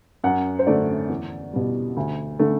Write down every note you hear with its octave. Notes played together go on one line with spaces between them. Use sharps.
F#2 F#5
C5
D3 A3 D5
E2
B2 G3
D2
D3 A3